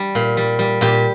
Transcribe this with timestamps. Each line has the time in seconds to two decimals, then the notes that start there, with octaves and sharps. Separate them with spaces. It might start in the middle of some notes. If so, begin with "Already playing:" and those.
Already playing: G3
0.15 A#2
0.37 G3
0.59 G3
0.81 A#2 G4